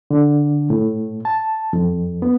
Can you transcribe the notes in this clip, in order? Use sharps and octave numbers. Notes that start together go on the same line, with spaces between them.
D3
A2
A5
F2
B3